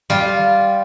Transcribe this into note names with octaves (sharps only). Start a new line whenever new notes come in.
G3 F4